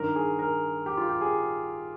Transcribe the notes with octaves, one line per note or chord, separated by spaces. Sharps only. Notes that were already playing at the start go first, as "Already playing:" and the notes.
Already playing: G2 D#3 A#4
G#4
A#4
G4
F4
G4
G#4